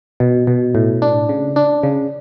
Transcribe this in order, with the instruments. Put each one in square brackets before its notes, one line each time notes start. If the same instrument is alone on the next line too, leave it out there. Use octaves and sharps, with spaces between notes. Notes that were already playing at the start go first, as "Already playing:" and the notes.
[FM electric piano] B2
B2
A2
D4
C#3
D4
C#3